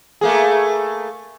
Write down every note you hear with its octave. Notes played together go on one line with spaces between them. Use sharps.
A3 A#3 G#4